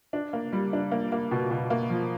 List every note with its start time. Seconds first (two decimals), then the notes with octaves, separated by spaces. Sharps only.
0.13 D4
0.33 A#3
0.53 G3
0.73 D4
0.91 A#3
1.12 A#3
1.31 B2
1.51 B2
1.70 A#3
1.90 F3